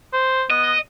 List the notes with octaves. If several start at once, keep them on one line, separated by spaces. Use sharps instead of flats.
C5
B3 D#5